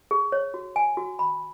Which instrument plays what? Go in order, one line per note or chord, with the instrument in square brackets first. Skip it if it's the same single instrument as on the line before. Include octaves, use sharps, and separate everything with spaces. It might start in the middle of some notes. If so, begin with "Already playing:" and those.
[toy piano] G#4
C#5
F#4
G#5
F#4
B5